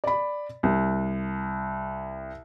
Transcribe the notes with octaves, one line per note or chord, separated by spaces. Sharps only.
D5 B5
C2